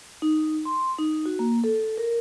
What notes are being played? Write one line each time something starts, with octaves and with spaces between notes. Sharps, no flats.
D#4
C6
D#4
F#4
A#3
A4
A#4